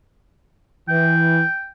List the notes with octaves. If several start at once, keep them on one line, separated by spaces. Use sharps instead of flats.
E3 G5